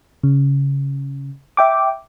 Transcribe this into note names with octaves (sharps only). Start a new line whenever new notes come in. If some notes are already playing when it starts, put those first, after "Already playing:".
C#3
E5 G5 D6